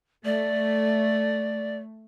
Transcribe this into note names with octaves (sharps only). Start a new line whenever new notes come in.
A3 D5